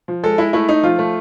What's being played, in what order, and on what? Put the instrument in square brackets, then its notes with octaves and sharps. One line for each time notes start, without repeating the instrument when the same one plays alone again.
[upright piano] F3
G#3 A4
G#3 E4
A3 E4
A3 D#4
F3 F4
A3